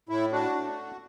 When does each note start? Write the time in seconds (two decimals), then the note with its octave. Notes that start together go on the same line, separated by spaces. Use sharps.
0.09 A2 E4
0.32 D4 F#4
0.55 A3